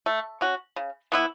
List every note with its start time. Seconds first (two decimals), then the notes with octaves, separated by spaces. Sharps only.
0.06 A3
0.41 C#4 F#4
0.76 C#3
1.12 E3 B3 E4